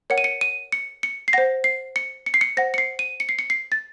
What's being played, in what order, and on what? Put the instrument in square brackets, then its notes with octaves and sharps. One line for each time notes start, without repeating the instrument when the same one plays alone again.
[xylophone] A#4 C#5 F#5 C#7
D#7
C#7
D#7
C#7
C#7
C7
C5 F#5 A#6
C7
C#7
C#7
C7
C#7
C5 F#5 A#6
C#7
C7
D#7
C#7
C7
C#7
C7
A6